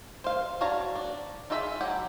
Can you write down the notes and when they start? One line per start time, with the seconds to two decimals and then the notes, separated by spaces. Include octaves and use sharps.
0.24 C5 F5
0.61 D4 F#4 C#5 F5 A#5
0.95 D4
1.50 D#4 F4 G#4 E5 B5
1.81 F#3 G4 F#5